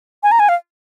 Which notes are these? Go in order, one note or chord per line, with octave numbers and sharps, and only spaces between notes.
G#5
A#5
G#5
F5